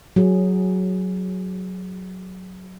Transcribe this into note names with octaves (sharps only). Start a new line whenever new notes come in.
F#3 G#4